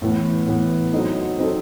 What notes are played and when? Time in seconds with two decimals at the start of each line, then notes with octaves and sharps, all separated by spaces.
0.02 A2 E3 B3
0.47 A2 E3 B3
0.92 F#3 C4 D#4 A4
1.38 F#3 C4 D#4 A4